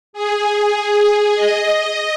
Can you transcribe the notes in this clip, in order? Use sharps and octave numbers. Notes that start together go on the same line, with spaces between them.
G#4
D#5